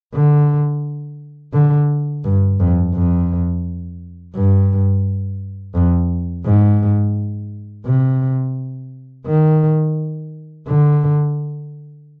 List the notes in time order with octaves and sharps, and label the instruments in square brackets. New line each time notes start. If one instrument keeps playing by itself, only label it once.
[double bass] D3
D3
G2
F2
F2
G2
F2
G#2
C3
D#3
D3